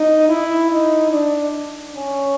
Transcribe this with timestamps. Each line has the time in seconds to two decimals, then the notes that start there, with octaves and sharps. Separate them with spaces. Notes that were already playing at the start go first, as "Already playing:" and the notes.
Already playing: D#4
0.29 E4
0.70 D#4
1.12 D4
1.95 C#4